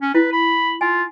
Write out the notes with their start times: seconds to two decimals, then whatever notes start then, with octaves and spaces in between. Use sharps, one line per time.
0.02 C#4
0.15 E4 B4
0.32 B5
0.81 F4 G#5